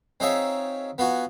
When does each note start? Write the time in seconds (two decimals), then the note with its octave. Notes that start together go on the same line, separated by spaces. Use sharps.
0.20 C4 D#4 F4 G#4 C#5 E5
0.98 B3 F4 F#4 G#5